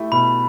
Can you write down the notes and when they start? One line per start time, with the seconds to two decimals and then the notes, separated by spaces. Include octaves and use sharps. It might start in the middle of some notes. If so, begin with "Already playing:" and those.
Already playing: A3 E4 G4
0.12 B2 B5